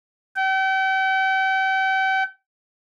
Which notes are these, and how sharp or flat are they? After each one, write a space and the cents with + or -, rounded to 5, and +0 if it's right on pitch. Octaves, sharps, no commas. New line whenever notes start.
G5 -40